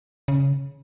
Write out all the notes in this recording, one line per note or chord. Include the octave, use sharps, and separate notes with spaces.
C#3